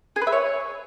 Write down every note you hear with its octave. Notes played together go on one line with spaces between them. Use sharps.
G#4
B4
E5
C#5